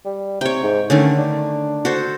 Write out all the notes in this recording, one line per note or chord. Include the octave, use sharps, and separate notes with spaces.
G3
C3 C#5 G5
G#2
D3 D#3 A3 C#4
D4
F#4 A4 C5